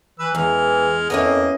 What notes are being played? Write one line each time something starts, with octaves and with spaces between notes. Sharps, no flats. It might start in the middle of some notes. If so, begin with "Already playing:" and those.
E3 B4 E6
E2 E3 G#3 F6
F2 A#3 B3 C#4 E4 D#5